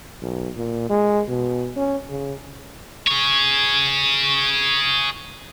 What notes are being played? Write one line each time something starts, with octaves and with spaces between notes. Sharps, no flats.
B1
A#2
G#3
B2
C#4
C#3
G#4 C#5